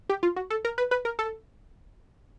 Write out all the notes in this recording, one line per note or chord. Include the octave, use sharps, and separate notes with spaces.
G4
F4
F#4
A4
A#4
B4
B4
A#4
A4